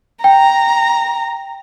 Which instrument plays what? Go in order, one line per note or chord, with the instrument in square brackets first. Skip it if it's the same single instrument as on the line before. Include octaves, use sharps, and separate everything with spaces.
[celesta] G5 [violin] A#5